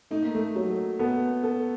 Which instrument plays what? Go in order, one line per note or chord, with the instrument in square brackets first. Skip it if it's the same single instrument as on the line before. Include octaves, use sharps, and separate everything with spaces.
[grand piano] A3 [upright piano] D#4
[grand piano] A#3
A3
[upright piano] F#3
[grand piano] B3 [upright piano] A4
[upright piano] A4